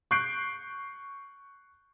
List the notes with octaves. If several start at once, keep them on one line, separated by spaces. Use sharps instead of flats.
C#6 F#6 G6 C7 D7